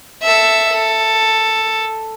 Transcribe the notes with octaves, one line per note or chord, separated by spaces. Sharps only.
A4 E5
A4